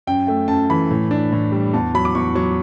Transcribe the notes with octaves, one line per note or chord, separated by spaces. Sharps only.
F#2 G5
A3 G5
F#2 A5
E3 B5
A2
D4
A2
G3
E2 A5
F#3 B5
D6
E2 C#6
F#3 C#6